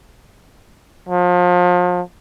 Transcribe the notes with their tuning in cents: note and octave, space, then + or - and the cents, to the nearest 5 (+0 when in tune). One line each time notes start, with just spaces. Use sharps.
F3 +35